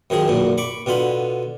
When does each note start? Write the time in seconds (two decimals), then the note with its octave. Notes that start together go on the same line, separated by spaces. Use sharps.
0.10 F#2 D#3 F3 G#4
0.28 B1 F#2 A#2
0.58 B5 C#6 D6
0.86 B2 D3 F4 B5